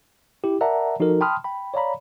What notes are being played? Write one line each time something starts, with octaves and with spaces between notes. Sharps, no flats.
E4 G4
A#4 D5 E5 F#5 A5 A#5
F3 D#4 F#4 A4 A#4
G5 A5 B5 C6 D#6 F6
G5 B5
C#5 D5 F5 A#5 B5